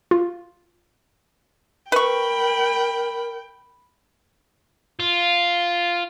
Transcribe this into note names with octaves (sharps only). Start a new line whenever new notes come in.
F4
A#4 B4 G5 B5 C#6
F4